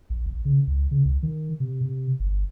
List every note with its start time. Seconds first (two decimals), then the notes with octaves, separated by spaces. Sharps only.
0.10 A#1
0.26 A#1
0.45 C#3
0.67 C#2
0.91 C#3
1.05 C#2
1.23 D#3
1.60 C3
1.81 C3
2.20 G1